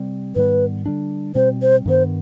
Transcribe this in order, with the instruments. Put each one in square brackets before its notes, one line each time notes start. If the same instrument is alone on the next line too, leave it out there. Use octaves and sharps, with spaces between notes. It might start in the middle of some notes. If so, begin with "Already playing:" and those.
Already playing: [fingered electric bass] C3 G3 C4
[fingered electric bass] G#2 D#3 G3 B3 [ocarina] B4
[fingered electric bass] D3 G3 D4
[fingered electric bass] B2 G3 C4 [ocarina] C5
[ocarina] C5
[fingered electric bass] G2 D#3 B3 [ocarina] C5